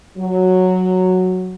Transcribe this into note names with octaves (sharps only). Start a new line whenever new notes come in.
F#3